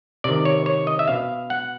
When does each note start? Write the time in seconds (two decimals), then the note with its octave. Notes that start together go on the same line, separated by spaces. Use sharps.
0.24 C3 D#3 D5
0.45 C#5
0.66 C#5
0.87 D#5
0.99 E5
1.08 B2 F5
1.50 F#5